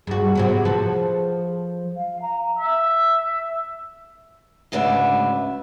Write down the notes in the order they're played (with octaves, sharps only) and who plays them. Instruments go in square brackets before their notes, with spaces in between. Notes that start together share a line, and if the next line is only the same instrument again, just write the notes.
[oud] G2 F#4 [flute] G#4
[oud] C3 F#3 B3
F3 A4 B4
[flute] F5
A#5
[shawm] E5
[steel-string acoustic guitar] D2 G#2 C#3 D4 B4 E5